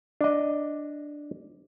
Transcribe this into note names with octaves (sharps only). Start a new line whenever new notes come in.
D4 D#5